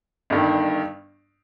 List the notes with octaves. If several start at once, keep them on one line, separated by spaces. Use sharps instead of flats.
G1 G2 D#3